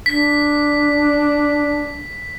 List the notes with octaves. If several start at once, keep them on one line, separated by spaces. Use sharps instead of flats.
D4 B6